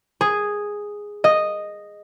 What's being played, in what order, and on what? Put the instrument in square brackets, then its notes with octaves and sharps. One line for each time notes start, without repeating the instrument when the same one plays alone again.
[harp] G#4
D#5